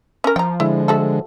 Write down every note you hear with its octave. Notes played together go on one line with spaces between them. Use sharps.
C#4 A#4
F3 G5 A#5
D3 G#3 E4
A3 F#4 A4